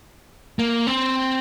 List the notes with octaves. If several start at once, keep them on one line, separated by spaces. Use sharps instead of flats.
A#3
C4